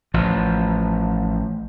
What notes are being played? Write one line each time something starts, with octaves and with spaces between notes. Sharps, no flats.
A1 F3